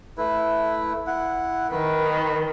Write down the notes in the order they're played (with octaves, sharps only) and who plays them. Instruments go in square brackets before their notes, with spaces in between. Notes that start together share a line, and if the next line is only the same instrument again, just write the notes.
[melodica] A3 E4 B4
E4 F#5
[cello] D#3 [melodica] B4